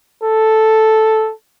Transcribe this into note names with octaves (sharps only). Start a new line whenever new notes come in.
A4